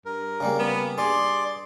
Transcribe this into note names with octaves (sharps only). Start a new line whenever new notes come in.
G2 A#4
C#3 G3 A#3
B3
G2 G#4 D5 C6